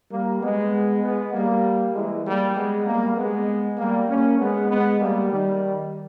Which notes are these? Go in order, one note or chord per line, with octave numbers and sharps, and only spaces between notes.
G3 A#3
G#3 B3
G#3 B3
G3 A#3
E3 G#3
G3 A#3
G#3 B3
G3 A#3
G#3 B3
G3 A#3
A#3 C#4
G#3 B3
G#3 B3
G3 A#3
D#3 G3